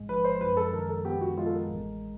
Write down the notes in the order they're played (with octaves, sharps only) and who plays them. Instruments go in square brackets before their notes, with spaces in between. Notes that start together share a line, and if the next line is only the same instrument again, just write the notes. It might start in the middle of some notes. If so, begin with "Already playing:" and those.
Already playing: [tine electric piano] A1 G#2 G#3
[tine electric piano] F3 [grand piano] B4
[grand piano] C5
[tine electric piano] F#2 [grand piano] B4
[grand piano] A4
[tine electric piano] D#3 [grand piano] A#4
[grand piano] A4
[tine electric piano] B3 [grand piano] G4
[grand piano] F#4
[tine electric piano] G#3 [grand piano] F4
[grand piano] A4
A#4
[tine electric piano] A1